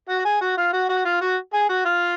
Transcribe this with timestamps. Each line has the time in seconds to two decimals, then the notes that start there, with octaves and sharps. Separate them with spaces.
0.09 F#4 F#5
0.20 F#5
0.25 G#4 G#5
0.41 F#4 F#5
0.57 F4 F5
0.73 F#4 F#5
0.89 F#4 F#5
1.05 F4 F5
1.21 F#4 F#5
1.53 G#4 G#5
1.69 F#4 F#5
1.85 F4 F5